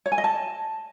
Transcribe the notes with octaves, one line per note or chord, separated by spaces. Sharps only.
C#5
G#5
D#5
A5